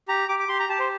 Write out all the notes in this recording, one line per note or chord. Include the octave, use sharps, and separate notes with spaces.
G4 A#5
G4 D6
D6
G4 C6
A#5
G4 A5
C5